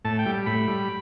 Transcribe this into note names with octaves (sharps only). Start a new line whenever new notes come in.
A2 A5
G5
G3
A2 B5
G3